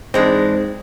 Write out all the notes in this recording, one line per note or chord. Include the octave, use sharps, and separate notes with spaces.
G#2 E3 G#3 C4 D4